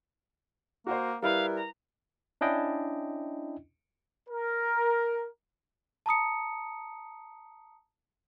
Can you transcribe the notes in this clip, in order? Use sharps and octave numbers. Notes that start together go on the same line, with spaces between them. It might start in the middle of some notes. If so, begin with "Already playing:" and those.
A#3 F#4 C5
G3 E4 A#4 B4 F5
A#5
C#4 D4 E4 D#5 G5
A#4
A5 A#5 D#6 C#7